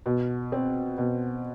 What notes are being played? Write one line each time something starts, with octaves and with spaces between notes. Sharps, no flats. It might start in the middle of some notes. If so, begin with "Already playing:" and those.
B2
C4
B2